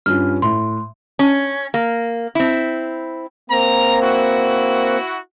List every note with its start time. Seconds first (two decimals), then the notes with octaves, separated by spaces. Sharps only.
0.06 G2 C#4 F4 F6
0.42 A2 C6
1.19 C#4
1.74 A#3
2.35 C4 E4
3.50 A#3 C4 A#5
4.00 E4 F#4